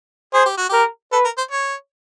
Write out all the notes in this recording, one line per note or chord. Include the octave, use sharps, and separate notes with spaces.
G#4 C5
G4
F#4
G4 A#4
A4 B4
A#4
C5
C#5